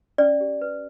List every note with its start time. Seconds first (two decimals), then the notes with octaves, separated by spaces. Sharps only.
0.18 C#4 D5
0.41 G4
0.62 B4